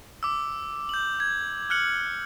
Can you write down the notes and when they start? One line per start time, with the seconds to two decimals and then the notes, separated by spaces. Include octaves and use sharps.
0.23 D6 E6
0.89 G6 F#7
1.20 G#6
1.70 F6 F#6 C#7 F#7